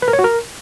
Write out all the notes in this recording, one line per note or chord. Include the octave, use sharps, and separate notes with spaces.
B4
A#4
C#5
F#4
A#4